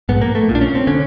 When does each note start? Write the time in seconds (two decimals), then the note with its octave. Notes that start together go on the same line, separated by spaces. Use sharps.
0.09 A#1 G#2 B3
0.22 A#3
0.35 A3
0.48 B1 A#2
0.55 D4
0.61 C#4
0.75 C4
0.87 D3 C#4